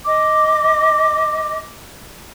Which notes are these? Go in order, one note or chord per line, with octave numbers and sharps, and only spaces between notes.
D#5 D6